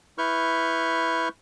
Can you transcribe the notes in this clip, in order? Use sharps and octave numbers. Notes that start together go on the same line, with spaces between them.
E4 B4 C#6 F6 G6